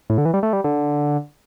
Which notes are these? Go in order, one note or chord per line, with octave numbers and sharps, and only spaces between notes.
A2
D3
E3
G3
A3
G3
D3